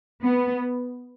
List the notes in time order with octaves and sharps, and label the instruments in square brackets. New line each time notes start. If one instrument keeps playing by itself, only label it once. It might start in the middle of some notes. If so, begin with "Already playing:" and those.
[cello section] B3